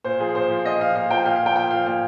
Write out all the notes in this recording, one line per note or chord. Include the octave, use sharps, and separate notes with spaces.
A#2 C5
F3 G#4
A#2 C5
F3
A#2 D#5
F3 F5
A#2 F5
F3 G5
A#2 F5
F5
F3 G5
A#2 G5
F3 F5
A#2 F5